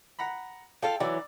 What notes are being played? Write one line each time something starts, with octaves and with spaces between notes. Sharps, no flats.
F#5 A#5 B5
F4 A4 F5 G5
E3 F#3 D5 E6